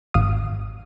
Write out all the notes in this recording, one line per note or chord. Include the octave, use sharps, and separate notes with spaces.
G#1 F5 D#6